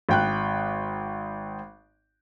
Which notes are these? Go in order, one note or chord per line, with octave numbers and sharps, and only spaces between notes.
G#1 G5 F#6